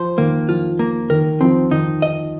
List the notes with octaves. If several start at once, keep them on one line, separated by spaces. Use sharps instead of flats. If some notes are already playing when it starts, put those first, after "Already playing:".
Already playing: F3 C5
D#3 A#3
F3 F4
A#3
D#3 A#4
F3 C4
D#3 D#4
D#5